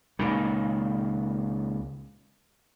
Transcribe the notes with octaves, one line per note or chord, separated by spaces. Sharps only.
C#2 A#2 D#3